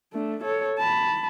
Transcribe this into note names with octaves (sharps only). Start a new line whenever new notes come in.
A3 D4
A4 C#5
A5 B5